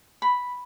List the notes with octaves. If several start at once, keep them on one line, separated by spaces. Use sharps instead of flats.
B5